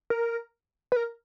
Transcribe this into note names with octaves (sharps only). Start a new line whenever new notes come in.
A#4
B4
A#4